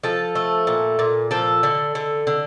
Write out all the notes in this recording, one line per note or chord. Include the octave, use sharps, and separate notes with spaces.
F3 A4
A3
A#2
A#2
F3 A4
D3
D3
D3